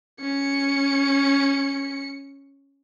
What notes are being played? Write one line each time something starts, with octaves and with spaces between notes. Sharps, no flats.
C#4 C#7